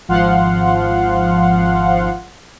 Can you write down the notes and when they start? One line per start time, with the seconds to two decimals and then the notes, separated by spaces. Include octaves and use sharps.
0.08 G#1 F3 F5 F#5 C6